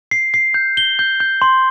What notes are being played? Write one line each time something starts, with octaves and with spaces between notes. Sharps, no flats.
C7
C7
G6
G7
G6
G6
C6